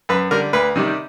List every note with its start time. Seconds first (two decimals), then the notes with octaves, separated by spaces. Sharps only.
0.09 F#2 B4
0.31 D3 G3 A#4
0.53 D2 B4
0.76 C3 D#3 G3